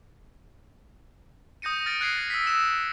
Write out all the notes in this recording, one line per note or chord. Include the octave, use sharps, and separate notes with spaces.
D#6 G6 A#6 C#7 D#7
F6 A6 A#6 C#7 D7
F#6 G#6 C7 C#7
A6
E6 A#6 B6
E6 E7